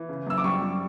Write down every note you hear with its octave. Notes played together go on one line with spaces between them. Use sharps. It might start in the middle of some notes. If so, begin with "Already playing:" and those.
Already playing: E3
C#3
F#2 E6
D6
G3 C#6
G3